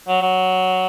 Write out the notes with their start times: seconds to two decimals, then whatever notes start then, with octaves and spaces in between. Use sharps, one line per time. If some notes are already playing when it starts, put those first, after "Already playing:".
0.08 F#3
0.22 F#3